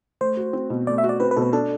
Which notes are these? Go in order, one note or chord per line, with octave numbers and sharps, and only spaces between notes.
A3 C5
F#4
C4
B2
A3 D5
E5
F#4
D5
C4 B4
B4
B2 A4
B4
D4 A4